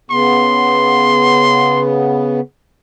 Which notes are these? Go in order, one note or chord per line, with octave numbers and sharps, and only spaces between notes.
C#3 B3 C6